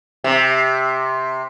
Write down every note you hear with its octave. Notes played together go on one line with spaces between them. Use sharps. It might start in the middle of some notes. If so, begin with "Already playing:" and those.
C3